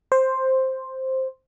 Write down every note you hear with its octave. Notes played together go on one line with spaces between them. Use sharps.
C5